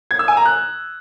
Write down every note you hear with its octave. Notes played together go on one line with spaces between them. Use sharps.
G#6
E6
G#5
A#5
F#6